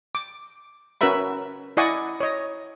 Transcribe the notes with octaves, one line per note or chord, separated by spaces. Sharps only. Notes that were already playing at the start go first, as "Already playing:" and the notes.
D6
C#4 F#4 A#4 B4 E5 B5
E4 D5 D#5 F#5 G#5 C#6
C#5 D#5